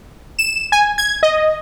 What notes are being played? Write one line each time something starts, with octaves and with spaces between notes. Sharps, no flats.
E7
G#5
G#6
D#5